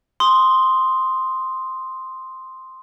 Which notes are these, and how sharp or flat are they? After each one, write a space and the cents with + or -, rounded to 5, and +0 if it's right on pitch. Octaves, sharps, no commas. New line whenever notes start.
C6 +0 D#6 +0